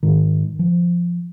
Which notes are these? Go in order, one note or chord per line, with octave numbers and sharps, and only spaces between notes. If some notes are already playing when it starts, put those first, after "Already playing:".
G#2 D#3
F3